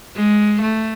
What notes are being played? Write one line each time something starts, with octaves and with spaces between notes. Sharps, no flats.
G#3
A3